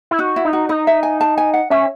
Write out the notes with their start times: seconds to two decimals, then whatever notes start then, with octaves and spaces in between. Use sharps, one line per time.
0.11 E4
0.19 D#4 F#4
0.36 E4
0.45 D#4
0.53 F#4
0.69 D#4 D#5
0.87 E5
1.03 G#5
1.21 A5
1.38 G#5
1.54 F#5
1.70 C#4 E5